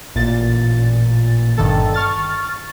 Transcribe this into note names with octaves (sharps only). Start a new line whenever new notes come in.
A1 A#2 A6
G1 G2 D#3 A4 A6
C#6 F6 A6